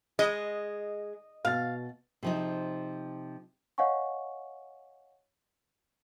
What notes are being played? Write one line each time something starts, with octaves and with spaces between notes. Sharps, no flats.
G#3 D#5
B2 F5 A6
C3 F3 D#4
C#5 D#5 F5 F#5 G#5 C#6